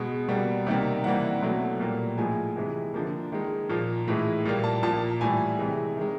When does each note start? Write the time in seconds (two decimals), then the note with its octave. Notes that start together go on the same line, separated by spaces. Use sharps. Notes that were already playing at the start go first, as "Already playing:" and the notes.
Already playing: B2 G#3
0.28 B2 G3 A#3
0.66 C3 D#3 G3 A#3
1.04 C3 E3 G3 A#3 F#5
1.42 B2 F#3 A3
1.80 A#2 G3 A#3
2.18 A2 F3 G#3 G#5
2.56 C3 E3 G#3
2.94 D3 F3 A#3
3.32 D#3 G#3
3.69 A#2 F3 A#3
4.08 A2 E3 G#3
4.45 A#2 G3 A#3
4.64 A5
4.83 A#2 F3 A#3 A5
5.21 A2 E3 G3 G#5
5.59 C3 E3 G#3
5.96 D#3 G#3